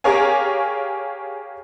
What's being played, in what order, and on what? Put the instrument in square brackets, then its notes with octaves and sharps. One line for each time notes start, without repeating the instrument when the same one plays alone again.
[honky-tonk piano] G4 G#4 A#4 C#5 F5 G#5